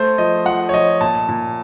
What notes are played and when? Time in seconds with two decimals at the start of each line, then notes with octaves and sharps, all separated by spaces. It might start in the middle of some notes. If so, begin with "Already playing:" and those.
Already playing: A3 C5
0.18 F3 D#5
0.46 F3 F#5
0.69 C#5
0.74 F3 D#5
1.01 A#2 A5
1.29 A#2